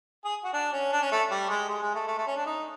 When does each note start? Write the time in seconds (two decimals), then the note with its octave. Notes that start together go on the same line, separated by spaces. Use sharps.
0.25 G#4
0.44 F#4
0.53 D4
0.73 C#4
0.92 D4
1.02 C#4
1.11 A3
1.31 G3
1.50 G#3
1.69 G#3
1.82 G#3
1.95 A3
2.08 A3
2.18 A3
2.27 C#4
2.37 D4
2.46 D#4